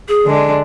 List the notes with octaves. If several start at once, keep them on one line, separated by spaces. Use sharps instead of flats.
G#4
D3 G#3 D4